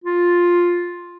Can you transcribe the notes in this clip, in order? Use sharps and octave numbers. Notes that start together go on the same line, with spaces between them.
F4